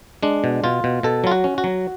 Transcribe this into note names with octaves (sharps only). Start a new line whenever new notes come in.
G#3 D4
B2
B2 F4
B2
B2 A4
F#3 F4
F#4
C#4
F#4
F#3